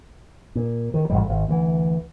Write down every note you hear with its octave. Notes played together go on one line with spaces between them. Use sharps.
A#2
D#3
A1 G#2 G3
G#1
D2 E3